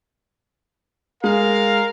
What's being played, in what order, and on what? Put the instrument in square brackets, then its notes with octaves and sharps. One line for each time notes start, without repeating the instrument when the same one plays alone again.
[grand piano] G#3 [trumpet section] A#4 F5